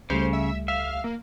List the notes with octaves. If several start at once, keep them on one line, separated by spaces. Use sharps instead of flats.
C#2 C#3 G3 A3 C5
E5
E5 F5
A#3